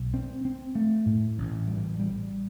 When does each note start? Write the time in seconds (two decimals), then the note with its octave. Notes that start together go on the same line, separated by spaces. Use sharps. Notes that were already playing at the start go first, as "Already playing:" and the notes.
Already playing: B1
0.14 C4
0.45 C4
0.75 A3
1.06 A2
1.38 A1
1.68 G3
1.99 G3